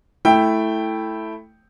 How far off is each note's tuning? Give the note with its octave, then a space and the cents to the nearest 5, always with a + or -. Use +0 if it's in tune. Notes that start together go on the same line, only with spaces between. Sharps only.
A3 +0 E4 +0 G5 +0